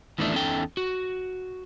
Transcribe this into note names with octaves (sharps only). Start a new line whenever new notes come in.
E2 A2 D#3 E3 A3 D4
E2 C#4 D#4 A4 G5
F#4